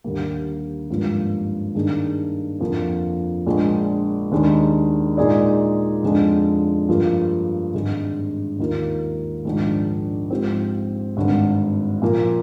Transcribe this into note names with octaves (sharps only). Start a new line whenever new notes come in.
D#2 D3 G3 A#3
G#1 G2 F3 A#3
G2 D#3 A#3 D4 G#4
F2 D3 F3 A#3
A#1 A#2 G#3 D4
D#2 D#3 G#3 D4
A#2 G#3 D#4 G#4 D5
F2 D3 G#3 D4
G2 F3 A#3 F4 G#4
G#1 G2 D3 G#3
D#2 D#3 A#3 F4 A#4
A#1 G#2 D#3 G#3 D4
G#2 F3 C4 G4 C5
G#1 G2 D3
A#2 F3 A#3